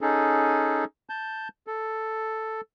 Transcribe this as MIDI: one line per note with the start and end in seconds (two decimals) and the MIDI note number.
0.01 0.84 61
0.01 0.84 63
0.01 0.84 68
0.01 0.84 69
1.10 1.48 81
1.10 1.48 91
1.67 2.61 69